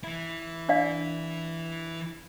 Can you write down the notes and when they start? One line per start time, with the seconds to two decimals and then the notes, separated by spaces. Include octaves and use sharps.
0.04 E3 E4
0.69 D4 D5 F5